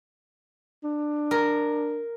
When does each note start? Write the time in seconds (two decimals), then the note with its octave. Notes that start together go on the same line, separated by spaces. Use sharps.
0.84 D4
1.31 A#4